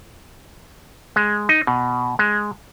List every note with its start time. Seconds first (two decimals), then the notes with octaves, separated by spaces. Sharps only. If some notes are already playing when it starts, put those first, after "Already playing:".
1.16 G#3
1.49 D#4
1.67 B2
2.19 G#3